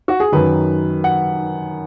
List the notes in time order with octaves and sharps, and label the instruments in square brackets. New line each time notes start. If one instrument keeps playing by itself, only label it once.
[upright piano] F#4
G#4
F#2 D#3 F#3 B4
F#5